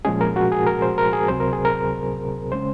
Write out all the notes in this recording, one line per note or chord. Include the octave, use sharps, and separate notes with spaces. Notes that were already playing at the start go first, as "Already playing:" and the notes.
A#2 F3 G#3 C#4 G#4
A#4
F#4
G#4
A#4
C5
A#4
G#4
C#2 C3 F#3 C4 C5
A#4
G#4
A#4
C#3 G#3 C#4 C5